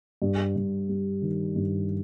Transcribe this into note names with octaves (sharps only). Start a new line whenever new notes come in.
G2
G2
G3
D#3
G2